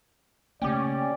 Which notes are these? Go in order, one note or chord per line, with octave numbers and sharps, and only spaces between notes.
C#3 A3 A#3 C#4 G4 D5 G5